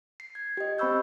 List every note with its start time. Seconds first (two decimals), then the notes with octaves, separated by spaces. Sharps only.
0.20 C7
0.35 G#6
0.57 G4 D#5
0.78 C4 C5 B5 C#6 E6 G6